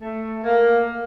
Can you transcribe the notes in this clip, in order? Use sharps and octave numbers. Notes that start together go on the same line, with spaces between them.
A3
A#3